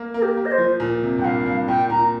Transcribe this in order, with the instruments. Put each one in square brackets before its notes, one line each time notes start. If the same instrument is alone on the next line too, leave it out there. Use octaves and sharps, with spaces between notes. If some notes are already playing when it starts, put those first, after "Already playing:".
Already playing: [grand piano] A#3
[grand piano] A#3 [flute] A#4
[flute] G4
[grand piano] A#3
[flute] D#5
C5
[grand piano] F3
A#2
C3
[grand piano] G2 [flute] G5
[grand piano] A#2 [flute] F5
[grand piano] G2
[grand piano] A#2 [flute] G5
[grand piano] A#2 [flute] A#5